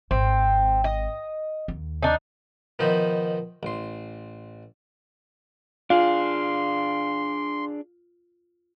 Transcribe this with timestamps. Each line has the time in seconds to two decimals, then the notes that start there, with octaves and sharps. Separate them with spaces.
0.11 G#1 C4
0.84 D#5
1.68 D#2
2.03 D4 D#4
2.79 B2 D#3 F3 D#4 E5
3.63 A1 C6
5.90 D4 F4 G#4 F5 C6